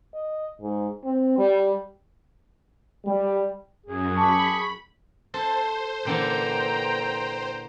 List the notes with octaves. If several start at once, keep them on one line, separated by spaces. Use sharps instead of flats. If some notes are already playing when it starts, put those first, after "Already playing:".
D#5
G#2
C4
G3
G3
F#2 G#4
A5 B5 C#6 D6
A4 C5
A#2 D3 E3 G5 A#5